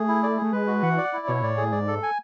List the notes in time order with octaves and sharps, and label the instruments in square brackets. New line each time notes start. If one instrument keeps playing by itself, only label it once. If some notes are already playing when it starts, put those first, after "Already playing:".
Already playing: [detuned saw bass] A3 [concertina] G#4
[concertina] E4
D5
[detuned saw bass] A3 [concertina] G#4
[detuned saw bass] G#3 [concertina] B4
[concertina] F#4
[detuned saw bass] E3 [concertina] F#5
[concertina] D5
E4
[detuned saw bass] B2 [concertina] C#5
[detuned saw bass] A2 [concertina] D5
[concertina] G#4
[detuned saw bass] G#2 [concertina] D5
[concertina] A4
G#5